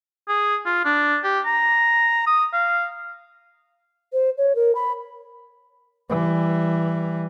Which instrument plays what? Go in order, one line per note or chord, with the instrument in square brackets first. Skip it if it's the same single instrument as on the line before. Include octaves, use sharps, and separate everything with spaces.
[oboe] G#4
F4
D4
G4
A#5
D#6
F5
[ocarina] C5
C#5
A#4
B5
[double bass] E3 G3